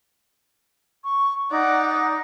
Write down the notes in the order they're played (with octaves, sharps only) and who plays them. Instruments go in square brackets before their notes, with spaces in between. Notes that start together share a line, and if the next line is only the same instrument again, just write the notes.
[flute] C#6
[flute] D#4 [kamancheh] D5 F#5